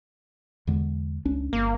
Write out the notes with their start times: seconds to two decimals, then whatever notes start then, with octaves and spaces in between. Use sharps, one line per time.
0.67 E2 D3 G#3
1.25 C#2 C#4 D4
1.53 G1 A#3